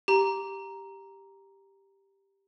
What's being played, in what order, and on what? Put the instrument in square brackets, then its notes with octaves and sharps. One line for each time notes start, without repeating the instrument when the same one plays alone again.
[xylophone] G4 A#5